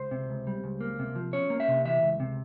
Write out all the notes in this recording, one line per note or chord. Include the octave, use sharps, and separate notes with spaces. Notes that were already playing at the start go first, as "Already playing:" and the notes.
Already playing: C#2 C5
C3
C#2
G3
C#2
A#3
C3
F3
C#4 C#5
A#3
E5
C3
E3 E5
C#2
C3